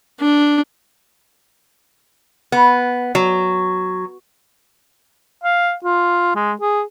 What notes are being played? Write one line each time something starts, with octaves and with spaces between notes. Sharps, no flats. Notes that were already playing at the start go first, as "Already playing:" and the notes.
D4
B3
F#3
F5
F4
G#3
G#4